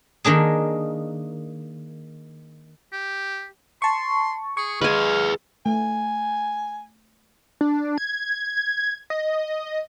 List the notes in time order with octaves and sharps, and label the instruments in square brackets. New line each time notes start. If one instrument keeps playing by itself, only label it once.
[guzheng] D#3 A#3 D4 G#4
[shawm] G4
[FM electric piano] A5 C#6 [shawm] C6
[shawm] G#4 [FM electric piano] C#6
[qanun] G#3 G#5 [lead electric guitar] G#4 B4 [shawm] F5
[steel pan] A3 [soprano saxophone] G#5
[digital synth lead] D4
G#6
D#5